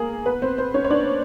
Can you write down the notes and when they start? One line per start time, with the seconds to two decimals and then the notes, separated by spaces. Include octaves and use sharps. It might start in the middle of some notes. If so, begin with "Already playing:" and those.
Already playing: A#3 G#4 A#4
0.26 B3 B4
0.42 C4 C5
0.58 C4 C5
0.74 C#4 C#5
0.84 C#5
0.90 D4 D5